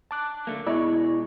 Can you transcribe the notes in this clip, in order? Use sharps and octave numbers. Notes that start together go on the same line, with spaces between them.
A5 D6 F#6
D3 A3 A#3
B2 G#3 E4 D5 C#6